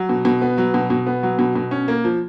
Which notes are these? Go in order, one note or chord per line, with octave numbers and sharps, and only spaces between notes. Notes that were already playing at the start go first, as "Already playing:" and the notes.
Already playing: F#3
B2
B2
B3
F#3
B2
B2
B3
F#3
B2
B2
C#4
A#3
F3